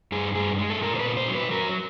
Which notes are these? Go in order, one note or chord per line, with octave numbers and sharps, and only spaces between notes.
G2 G#4
G2 G#4
G#3
A4
A#2 A#4
C5
B4
A#2
C5
F#3
B4
F#3 A#4